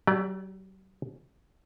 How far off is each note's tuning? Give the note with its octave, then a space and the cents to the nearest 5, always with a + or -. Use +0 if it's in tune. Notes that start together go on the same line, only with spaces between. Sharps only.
F#3 +45 G4 +15 D5 +10